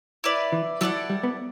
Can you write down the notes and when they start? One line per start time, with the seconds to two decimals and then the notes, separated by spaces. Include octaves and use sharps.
0.24 E4 B4 D5
0.52 E3
0.81 F#3 E4 A4 D5 F#5
1.10 G3
1.23 B3